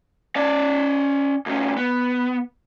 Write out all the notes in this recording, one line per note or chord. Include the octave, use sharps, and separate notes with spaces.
C#4 D5
D2 C#4
B3